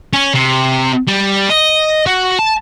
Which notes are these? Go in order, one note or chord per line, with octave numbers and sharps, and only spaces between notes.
C#4
C3
G3
D#5
F#4
A5